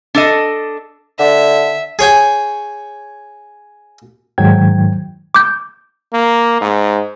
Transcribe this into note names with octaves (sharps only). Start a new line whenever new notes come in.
D4 A4 D#5
D3 E5
G#4 C#5 G5 G#5
G#2 D#3 F#3 G5 G#6
D6 G6
A#3
G#2